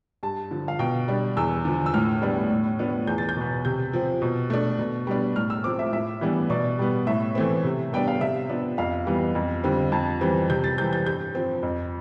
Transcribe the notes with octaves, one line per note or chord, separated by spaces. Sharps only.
G2 A5
D3 F3
F5
B2 G5
G3 D4
E2 E6
D3 F3
E6
A2 F6
G3 B3 D4
A2
F3 B3 D4
E2 G6
A6
G6
B2 B3
C3 G6
F3 C4
B2
A3 D4
B2
G3 B3 D4
A2 F6
E6
F3 C4 D6
E5
A2 E5
E3 G3 B3 D4
B2 D5
G3 B3
A2 E5
E3 A3 C4
C3
G3 B3 D4 G5
F5
C3 E5
F3 B3 D4
F2 F5
E3 G3 B3
F2
D3 G3 C4
F2 A5
E3 G3 C4
C3 G6
A6
E3 G3 C4 G6
G6
G2 G6
F3 C4
F2